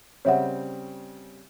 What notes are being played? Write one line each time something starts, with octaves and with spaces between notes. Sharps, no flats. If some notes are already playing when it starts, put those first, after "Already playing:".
C#3 G3 C4 C#5 E5 F#5